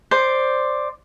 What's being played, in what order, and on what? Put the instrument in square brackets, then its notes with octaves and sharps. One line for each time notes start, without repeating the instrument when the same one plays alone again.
[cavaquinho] C5 D5